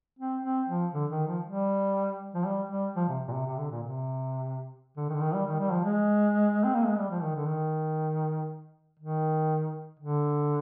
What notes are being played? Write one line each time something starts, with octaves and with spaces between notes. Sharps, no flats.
C4
C4
F3
D3
D#3
F3
G3
F3
G3
G3
F3
C3
A#2
C3
C3
D3
A#2
C3
D3
D#3
D3
D#3
G3
D#3
G3
F3
G#3
C4
A#3
G#3
G3
F3
D#3
D3
D#3
D#3
D3